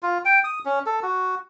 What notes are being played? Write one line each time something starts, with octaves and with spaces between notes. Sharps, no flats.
F4
G5
D#6
C#4
A4
F#4